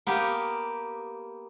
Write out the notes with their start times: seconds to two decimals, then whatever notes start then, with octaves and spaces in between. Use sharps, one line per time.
0.07 A#3 B3 G4